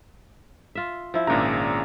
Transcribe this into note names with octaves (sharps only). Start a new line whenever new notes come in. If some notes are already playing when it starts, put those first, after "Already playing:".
F4 E5
F3 E4
G#1 A#2 C#3 D4 A#5